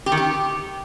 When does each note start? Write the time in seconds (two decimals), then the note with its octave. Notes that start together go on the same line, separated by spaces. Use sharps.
0.06 G4
0.12 D#3
0.17 G4